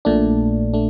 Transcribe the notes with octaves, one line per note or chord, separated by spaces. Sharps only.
A#1 A#2 A3 D4
A3 D4